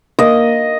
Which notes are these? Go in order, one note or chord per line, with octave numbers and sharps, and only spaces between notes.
A#3 D#5